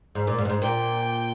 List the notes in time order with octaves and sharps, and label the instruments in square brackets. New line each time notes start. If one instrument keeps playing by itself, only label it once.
[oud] G#2
A#2
G#2
G2
G#2
[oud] A#2 [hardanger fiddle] G5